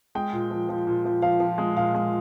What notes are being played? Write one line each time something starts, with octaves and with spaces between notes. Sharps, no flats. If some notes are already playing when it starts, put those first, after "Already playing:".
G#3 G5
A#2
F3
F3
A#2
F3
F3 F5
F3
G#3
A#2 F5
G#3